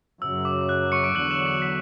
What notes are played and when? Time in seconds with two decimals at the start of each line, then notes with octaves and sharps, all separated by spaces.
0.21 F#2 C#3 F#3 E6
0.45 D6
0.69 F#6
0.92 C#6 C#7
1.04 D6 D7
1.15 E2 D3 F#3 F#6 F#7
1.31 E6 E7
1.46 D6 D7
1.62 B6